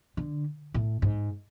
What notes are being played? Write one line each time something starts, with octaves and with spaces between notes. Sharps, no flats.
D3
A2
G#2